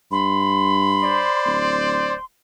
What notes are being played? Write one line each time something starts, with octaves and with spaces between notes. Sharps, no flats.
G2 B5 C6
C5 D5
D1